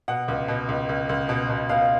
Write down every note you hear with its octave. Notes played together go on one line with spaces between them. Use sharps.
B2 F#5
C#2
B2
C#2
C#2
C#2
B2
B2
B2 F5